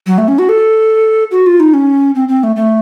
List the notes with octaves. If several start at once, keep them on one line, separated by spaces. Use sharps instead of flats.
F#3
A3
C#4
F#4
A4
F#4
F4
D#4
C#4
C4
C4
A3
A3